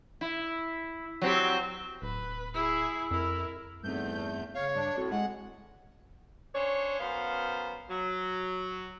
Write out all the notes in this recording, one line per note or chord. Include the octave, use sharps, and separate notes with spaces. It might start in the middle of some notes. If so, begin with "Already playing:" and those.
E4
F#3 C4 G4
D1 B4
E4 G#4
F2 E4 A#4
E2 G2 A3 C4 D#4 G6
C#3 C#5 F5
G2 D4
A2 C4 F#4 A4
G#3 G#4 F#5
C#4 D4 C5 C#5
F#2 B3 C5 F5
F#3